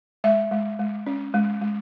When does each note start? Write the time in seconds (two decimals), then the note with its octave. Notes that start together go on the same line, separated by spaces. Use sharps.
0.24 G#3 E5
0.51 G#3
0.79 G#3
1.07 C#4
1.34 G#3
1.62 G#3